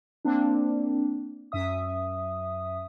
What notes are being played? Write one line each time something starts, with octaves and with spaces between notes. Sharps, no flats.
A#3 C4 D4
F#2 E5 D#6